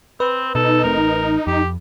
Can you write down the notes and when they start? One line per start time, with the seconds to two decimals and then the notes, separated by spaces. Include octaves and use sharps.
0.20 C4 B4
0.55 B2 D#4 A4
0.84 F1 A3 C4 A#4
0.98 A1
1.47 F2 G4